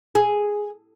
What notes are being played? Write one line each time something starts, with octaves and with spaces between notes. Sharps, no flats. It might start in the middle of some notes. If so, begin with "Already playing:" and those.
G#4